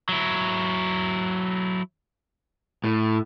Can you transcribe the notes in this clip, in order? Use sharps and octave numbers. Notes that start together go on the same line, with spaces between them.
F#3 E4
A2